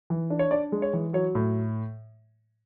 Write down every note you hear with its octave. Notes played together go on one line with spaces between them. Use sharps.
E3
D4
C#5
D4 D5
G#3
C#5
E3
F#3 C#5
A2